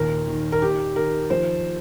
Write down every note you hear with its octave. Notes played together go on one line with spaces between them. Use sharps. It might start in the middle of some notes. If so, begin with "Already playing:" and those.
Already playing: D#2 A#2 A#4
D#3
A#4
D#3 G4
D#3 A#4
F3 C5